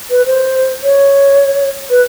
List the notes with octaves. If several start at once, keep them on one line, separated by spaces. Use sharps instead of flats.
B4
C5
C#5
B4